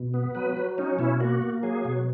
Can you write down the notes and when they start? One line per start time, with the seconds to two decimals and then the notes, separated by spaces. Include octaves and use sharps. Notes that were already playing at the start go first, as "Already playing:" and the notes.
Already playing: B2
0.14 B3
0.35 F#3 B4
0.57 F#3
0.78 C#4 D#4
0.99 B2 E4
1.21 A#3 F#4
1.42 A#3
1.63 F#3 G#4
1.85 B2